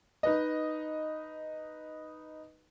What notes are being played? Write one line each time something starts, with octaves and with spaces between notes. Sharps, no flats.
D#4 B4 D#5